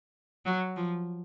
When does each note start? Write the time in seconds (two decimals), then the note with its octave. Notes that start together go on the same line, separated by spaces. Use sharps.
0.46 F#3
0.77 F3